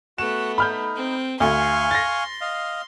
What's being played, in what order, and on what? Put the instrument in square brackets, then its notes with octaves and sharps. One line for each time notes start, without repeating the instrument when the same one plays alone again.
[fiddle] A3 B3 [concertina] F#4 F#5 [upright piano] E7
[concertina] D#4 [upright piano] B5 F6 G6
[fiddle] C4
[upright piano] D2 [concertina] F5 G#5 C#6 [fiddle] C6
[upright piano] A6 A#6
[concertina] D#5 F5